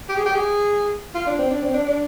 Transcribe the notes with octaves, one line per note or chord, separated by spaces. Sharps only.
G4
G#4
G4
G#4
F4
D4
C4
D4
C4
D4
D4